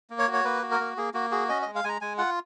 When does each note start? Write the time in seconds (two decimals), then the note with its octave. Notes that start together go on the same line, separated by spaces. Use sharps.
0.10 A#3
0.19 C#5
0.28 F#4
0.33 C#5
0.44 A#3 B4
0.62 F#4
0.71 A#4
0.80 A#3
0.97 A#3 G#4
1.14 A#3 F#4
1.32 F#4 G#4
1.49 C#4 D#5
1.62 G#3 D#5
1.75 F5
1.84 G#3 G#5 A#5
2.01 G#3 G#5
2.18 F4 F#5